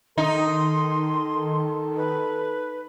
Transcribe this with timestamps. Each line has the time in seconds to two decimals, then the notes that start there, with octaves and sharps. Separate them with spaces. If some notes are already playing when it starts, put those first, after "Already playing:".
0.18 D#3 D#4 A4 C6
1.97 B4